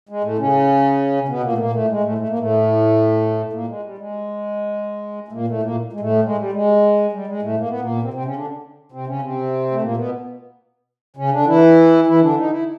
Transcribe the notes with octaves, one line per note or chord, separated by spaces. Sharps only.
G#3
A2 A3
C#3 C#4
B2 B3
A#2 A#3
A3
A#2 A#3
A2 A3
G#3
A2 A3
A3
A#3
A2 A3
A#2 A#3
G#3
G3
G#3
A3
A#2 A#3
A2 A3
A#2 A#3
G#3
A2 A3
G#3
G3
G#3
G3
G#3
A2 A3
A#3
B3
A#2 A#3
C3 C4
C3 C4
C#3 C#4
D3 D4
C3 C4
C#3 C#4
C3 C4
A3
A#2 A#3
B2 B3
C#3 C#4
D3 D4
E3 E4
E3 E4
D3 D4
D#4
E4